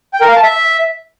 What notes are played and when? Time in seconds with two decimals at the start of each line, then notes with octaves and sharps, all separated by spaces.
0.13 G5
0.21 A#4
0.28 F5
0.35 A5
0.43 E5